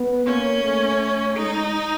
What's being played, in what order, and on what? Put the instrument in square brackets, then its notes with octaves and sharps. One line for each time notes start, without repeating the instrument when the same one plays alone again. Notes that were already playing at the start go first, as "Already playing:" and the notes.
Already playing: [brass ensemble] B3
[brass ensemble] A#3 [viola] C#4
[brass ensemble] A3
[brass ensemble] G#3 [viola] D#4